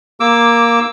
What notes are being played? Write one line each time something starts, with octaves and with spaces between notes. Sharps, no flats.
A#3 D6 E6